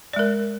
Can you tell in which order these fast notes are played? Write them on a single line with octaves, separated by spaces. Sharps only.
D5 G#3 A#4